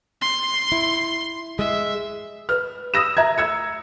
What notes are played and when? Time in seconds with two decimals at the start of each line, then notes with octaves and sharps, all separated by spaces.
0.22 C6
0.72 E4
1.59 G#3 E5
2.49 B4 F6
2.94 D#6 E6 A#6 E7
3.17 E5 A#5 G#6
3.38 E6 G#6 C#7